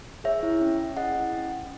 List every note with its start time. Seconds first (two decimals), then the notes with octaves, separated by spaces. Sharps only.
0.24 G#4 C#5 E5
0.43 E4
0.61 C#4
0.79 C#4
0.97 G#4 D#5 F#5
1.15 E4
1.33 C#4
1.52 C#4